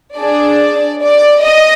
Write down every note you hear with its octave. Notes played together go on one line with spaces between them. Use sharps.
D4 G#4 D5
D5
D#5